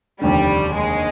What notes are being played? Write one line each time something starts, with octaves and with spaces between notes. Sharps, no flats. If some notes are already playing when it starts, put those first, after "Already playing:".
F1 D#2 D3 G3
G#3